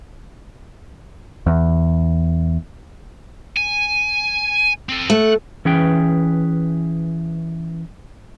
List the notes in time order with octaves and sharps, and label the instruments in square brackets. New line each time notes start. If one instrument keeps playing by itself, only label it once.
[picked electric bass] E2
[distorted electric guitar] G#5
C4 A4
[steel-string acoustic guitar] A3 [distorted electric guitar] F#5
[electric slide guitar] E3 C#4 G#4 B4 G5